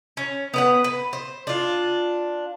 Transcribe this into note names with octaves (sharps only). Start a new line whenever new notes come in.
C#4
B3 B4 F#5
B4
C5
D4 F4